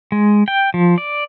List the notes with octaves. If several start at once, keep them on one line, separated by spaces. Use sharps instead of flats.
G#3
G5
F3
D5